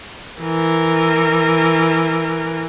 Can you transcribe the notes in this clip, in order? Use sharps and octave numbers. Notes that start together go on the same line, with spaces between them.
E3 A#4